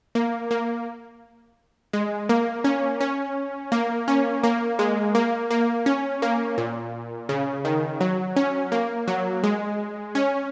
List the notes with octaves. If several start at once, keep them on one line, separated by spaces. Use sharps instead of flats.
A#3
A#3
G#3
A#3
C#4
C#4
A#3
C#4
A#3
G#3
A#3
A#3
C#4
A#3
A#2
C#3
D#3
F#3
C#4
A#3
F#3
G#3
C#4